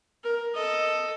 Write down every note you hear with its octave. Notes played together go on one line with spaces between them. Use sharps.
A#4
A4 D#5